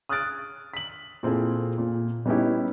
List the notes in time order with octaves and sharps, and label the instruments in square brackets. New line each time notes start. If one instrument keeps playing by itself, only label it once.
[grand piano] D#6 F6 F#6 G#6 A6 D7
B6 F#7
A#2 C4 E4 G#4 A4
A#2
G3 B3 C#4 D#4 E4 G4